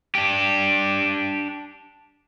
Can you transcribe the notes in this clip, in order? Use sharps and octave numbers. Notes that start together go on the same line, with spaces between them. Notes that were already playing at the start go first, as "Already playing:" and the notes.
D4 G4